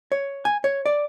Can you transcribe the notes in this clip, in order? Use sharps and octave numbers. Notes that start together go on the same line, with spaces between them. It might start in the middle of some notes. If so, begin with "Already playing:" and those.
C#5
G#5
C#5
D5